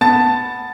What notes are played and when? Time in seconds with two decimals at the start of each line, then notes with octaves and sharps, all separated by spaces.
0.01 B3 A5 A6